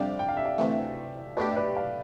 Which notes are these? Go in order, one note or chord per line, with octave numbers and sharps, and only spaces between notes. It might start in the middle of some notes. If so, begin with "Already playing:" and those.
Already playing: F2 C3 G3 D4 G4 D5 F5
G5
F5
E5
D5 F5
D2 C3 E3 A3
B2 A3 D4 G4 B4 D5
E5
B4 D5
D5 F5